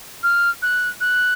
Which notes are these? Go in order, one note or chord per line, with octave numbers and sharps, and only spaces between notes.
F6
F#6
F#6